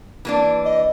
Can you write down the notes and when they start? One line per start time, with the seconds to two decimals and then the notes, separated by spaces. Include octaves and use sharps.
0.25 E3 A#3 D4
0.65 D#5